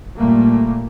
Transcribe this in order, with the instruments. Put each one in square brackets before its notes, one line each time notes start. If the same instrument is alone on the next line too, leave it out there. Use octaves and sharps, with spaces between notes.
[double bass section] A#2 G3 A3 A#3